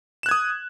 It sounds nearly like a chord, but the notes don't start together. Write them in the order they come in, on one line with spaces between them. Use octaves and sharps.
E7 F#6 G#6 D#6